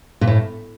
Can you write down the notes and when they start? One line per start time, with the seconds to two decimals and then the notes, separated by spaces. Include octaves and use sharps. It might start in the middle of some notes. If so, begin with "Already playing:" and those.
0.21 A#2
0.27 A2